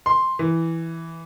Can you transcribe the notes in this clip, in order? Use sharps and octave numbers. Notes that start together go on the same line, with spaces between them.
C6
E3